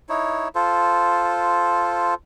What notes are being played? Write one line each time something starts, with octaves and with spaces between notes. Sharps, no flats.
D#4 E4 C#5
F4 A4 C5